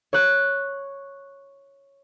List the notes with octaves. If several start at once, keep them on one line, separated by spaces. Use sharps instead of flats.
C#5 F#6